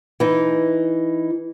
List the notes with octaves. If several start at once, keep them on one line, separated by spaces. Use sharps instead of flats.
E3 D#4